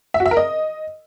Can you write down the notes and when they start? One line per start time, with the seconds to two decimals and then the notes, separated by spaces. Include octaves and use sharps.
0.14 E5
0.20 F#4
0.26 E5
0.31 A#4
0.37 D#5